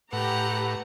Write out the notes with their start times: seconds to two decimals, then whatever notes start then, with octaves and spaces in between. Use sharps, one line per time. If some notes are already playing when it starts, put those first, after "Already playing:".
0.13 A2 G4 B4 F#5 A#5